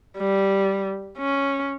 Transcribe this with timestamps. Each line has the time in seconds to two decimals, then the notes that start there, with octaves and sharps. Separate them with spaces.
0.18 G3
1.18 C#4